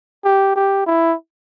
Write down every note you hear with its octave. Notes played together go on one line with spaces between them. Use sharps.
G4
G4
E4